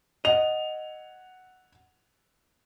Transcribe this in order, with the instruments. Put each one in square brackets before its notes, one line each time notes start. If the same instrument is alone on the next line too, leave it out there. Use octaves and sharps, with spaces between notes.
[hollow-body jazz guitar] D#5 [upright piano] F#5 F7